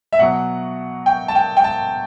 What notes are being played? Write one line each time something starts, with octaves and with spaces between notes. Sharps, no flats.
E5
B2 F#3 F#5
G5
A5
G5
G5
A5